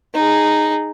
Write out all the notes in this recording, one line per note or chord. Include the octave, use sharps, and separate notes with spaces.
D#4 G#4